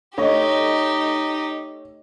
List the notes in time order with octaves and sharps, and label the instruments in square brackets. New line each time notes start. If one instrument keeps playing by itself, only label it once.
[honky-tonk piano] A3 C#5 D#5 [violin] D#4 G4